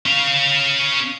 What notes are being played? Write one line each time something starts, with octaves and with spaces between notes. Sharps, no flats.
C#4 F5